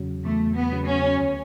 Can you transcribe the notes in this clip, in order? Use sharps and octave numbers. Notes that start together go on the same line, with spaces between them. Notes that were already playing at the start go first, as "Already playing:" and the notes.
Already playing: E2 C#3 F#3
E2 A3
B3
C#3 F#3
C#4
D2